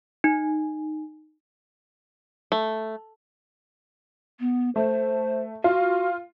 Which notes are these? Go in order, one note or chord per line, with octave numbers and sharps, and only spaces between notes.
D#4
A3
B3
A3 C5
F4 F#4